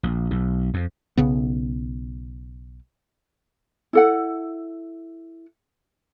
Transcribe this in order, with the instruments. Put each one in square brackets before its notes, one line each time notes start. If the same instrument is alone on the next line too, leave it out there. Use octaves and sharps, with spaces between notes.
[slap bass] A#1
B1
F2
[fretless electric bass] B1 C#3 B3
[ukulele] E4 A4 F#5